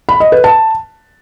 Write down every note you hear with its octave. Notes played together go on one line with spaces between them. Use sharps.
B5
D#5
B4
A5